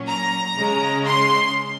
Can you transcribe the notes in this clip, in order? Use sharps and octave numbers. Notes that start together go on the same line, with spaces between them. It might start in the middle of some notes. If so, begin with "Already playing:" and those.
Already playing: A#2 F#3 C#4
A#5
C#3 G#3 C#4
C6